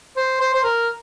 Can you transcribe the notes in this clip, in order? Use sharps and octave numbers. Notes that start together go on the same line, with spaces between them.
C5
C5
C5
A#4